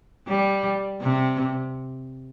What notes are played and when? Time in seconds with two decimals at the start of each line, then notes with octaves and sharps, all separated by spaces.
0.28 G3
1.01 C3